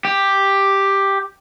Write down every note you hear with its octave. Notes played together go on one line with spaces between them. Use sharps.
G4